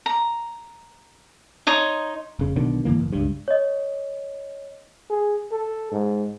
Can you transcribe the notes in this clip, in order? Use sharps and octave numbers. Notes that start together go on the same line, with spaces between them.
A#5
D#4 C#5 D#5 C6
F1 C#3
B1 B2 D3 D#3
G#2 D3 E3 A#3
F#1
C#2 G2
C#5 D#5
G#4
A4
G#2